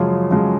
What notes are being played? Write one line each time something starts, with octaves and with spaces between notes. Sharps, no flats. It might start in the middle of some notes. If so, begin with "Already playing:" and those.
Already playing: F#2 C#3 F3 G#3
F#2 C#3 F3 G#3